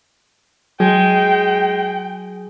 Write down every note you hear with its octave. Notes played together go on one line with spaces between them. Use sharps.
F#3 G#3 G5